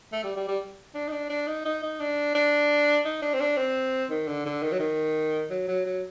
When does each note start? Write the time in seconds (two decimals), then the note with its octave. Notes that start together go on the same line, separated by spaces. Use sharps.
0.12 A3
0.24 G3
0.36 G3
0.48 G3
0.95 D4
1.08 D#4
1.12 D4
1.30 D4
1.47 D#4
1.65 D#4
1.83 D#4
2.00 D4
2.35 D4
3.05 D#4
3.22 D4
3.34 C4
3.41 D4
3.57 C4
4.10 D#3
4.28 D3
4.46 D3
4.63 D#3
4.72 F#3
4.80 D#3
5.50 F#3
5.68 F#3
5.86 F#3